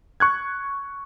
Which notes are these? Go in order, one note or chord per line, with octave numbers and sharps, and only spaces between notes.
C#6 F#6 G#6